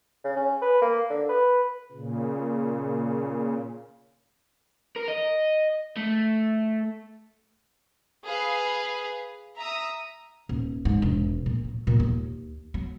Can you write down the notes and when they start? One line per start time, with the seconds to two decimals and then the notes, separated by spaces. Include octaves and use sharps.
0.24 C#3
0.36 C#4
0.62 B4
0.82 A#3
1.10 D3
1.29 B4
1.92 A#2 C#3
4.96 A#4
5.08 D#5
5.97 A3
8.25 G#4 B4 F5
9.57 E5 A#5 D#6
10.49 D#1
10.85 G#2
11.02 E1
11.46 A#2
11.64 F#3
11.87 A#2
12.00 D#2
12.74 F#3